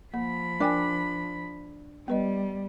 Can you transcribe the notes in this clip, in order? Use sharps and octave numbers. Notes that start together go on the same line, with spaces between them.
F3 A#3 B5
D4 A#4 G5 G#5
G3 B3 B4 D#5